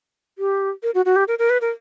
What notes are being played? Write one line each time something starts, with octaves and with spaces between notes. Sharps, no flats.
G4
A#4
F#4
F#4
G4
A#4
A#4
B4
A#4